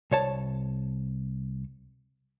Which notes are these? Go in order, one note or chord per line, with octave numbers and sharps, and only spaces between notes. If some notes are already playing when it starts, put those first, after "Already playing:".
C2 C#5 A5